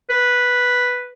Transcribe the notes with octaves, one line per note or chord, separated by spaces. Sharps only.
B4